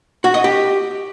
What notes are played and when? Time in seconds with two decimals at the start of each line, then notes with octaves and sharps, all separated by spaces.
0.24 F#4
0.34 D#5
0.44 G4